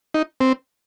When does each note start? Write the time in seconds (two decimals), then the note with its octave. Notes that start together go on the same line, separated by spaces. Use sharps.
0.14 D#4
0.41 C4